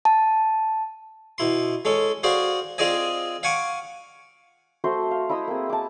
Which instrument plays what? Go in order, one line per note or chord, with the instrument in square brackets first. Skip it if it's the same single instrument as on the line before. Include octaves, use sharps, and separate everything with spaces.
[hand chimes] A5
[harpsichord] B2 E4 C6
G#3 C#4 A4
F#4 G#4 C5 D5 F5
C4 F4 G#4 D5 D#5 G#5
F5 F#5 G#5 C#6 D6
[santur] A3 F#4 C5 C6
F5
E4 D#5 D#6 E6
A#3 C4 G#4
A5 D6